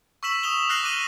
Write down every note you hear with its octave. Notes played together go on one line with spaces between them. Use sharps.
C#6 E6 B6 E7 F#7
D#6 E6 E7 F7 G7
F6 F#6 A#6 C7 E7 F#7
D6 A#6 D#7 G7